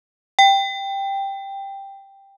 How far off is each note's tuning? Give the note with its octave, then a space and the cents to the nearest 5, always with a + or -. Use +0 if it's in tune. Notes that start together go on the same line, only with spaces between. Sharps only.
G5 +5